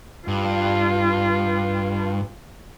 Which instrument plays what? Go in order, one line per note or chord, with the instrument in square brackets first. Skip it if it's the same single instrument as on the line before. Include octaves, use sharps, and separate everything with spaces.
[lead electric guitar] G2 [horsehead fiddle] F4